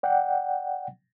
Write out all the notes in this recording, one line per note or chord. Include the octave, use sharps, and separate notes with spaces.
D5 F#5 G5